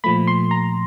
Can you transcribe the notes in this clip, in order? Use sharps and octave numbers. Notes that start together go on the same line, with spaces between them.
A#2 F3 A3 B5
C6
A#5